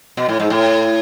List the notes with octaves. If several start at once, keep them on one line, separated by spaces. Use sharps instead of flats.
B2
A2
G#2
A2